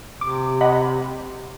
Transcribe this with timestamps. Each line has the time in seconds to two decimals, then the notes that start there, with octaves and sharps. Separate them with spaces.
0.21 C3 D6
0.61 D#5 F#5 B5